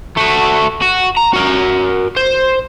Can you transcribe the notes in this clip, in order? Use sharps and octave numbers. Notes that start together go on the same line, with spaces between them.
A3 F#4
F#4
A#5
F#4 A#4
C5